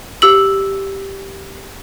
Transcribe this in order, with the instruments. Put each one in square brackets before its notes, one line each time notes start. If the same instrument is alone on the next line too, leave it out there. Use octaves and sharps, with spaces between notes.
[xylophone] G4 E6 F#7